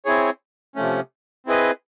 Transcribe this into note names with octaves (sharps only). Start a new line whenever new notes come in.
C4 E4 G#4 C#5
C3 F3 A3 C#4
C4 E4 G#4 B4 D#5